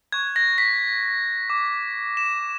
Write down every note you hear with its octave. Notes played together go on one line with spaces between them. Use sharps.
C#6 F#6 G#6
A#6
B6
D6 F#6
E7